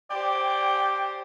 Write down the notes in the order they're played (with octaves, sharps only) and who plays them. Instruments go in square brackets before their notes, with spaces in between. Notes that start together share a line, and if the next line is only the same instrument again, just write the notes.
[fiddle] G4 C5 [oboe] D5 [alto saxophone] G5